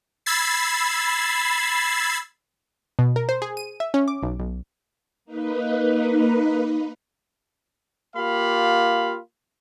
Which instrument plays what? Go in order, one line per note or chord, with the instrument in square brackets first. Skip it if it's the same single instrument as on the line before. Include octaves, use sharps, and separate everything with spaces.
[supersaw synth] B5 E6 G#6 A6 C7
[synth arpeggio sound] B2
A#4
C5
G#4
D#7
E5
C#4
D6
B1
B1
[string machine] A#3 D#4 B4
[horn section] A#3 F4 G4 F5 B5